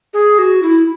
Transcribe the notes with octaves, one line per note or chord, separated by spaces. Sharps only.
G#4
F#4
E4